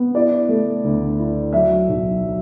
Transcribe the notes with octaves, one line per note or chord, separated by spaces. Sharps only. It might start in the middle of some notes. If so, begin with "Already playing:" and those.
Already playing: B3
E4 D5
A3
D2
E4
F#3 E5
B1
F#3